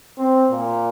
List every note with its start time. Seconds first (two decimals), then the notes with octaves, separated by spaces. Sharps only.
0.18 C4
0.51 A#2